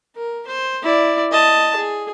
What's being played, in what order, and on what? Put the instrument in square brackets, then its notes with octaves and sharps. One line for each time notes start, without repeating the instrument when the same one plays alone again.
[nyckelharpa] A#4
C5
E4 D5
D#5 A5
G#4